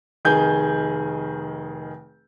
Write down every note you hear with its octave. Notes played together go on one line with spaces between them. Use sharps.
F1 D#3 G#4 G#5 G6